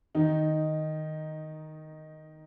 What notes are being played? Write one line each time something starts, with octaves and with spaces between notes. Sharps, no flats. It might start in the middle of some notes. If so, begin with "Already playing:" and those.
D#3 D#4